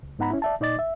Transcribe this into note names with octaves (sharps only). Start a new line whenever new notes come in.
C#2
G#2 B3 D#4 F#5 A#5 B5
C#4 E4
D5 E5 A5
A#2 D#4 D5 D#5 D6 A6
E5